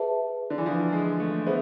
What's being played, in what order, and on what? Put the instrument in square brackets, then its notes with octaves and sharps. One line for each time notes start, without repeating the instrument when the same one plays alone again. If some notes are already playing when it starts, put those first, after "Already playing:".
Already playing: [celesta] G#4 B4 E5 A5
[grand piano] D3
E3
F3
G#3
A3
[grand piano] B3 [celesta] G#4 C5 E5